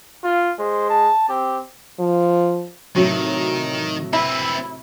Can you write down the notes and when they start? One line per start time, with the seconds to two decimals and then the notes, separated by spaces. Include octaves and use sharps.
0.23 F4
0.59 G#3 C5
0.90 A5
1.29 C4 G4
1.99 F3
2.96 A2 C3 D#3 F#3
4.13 C4 E4 B4 E5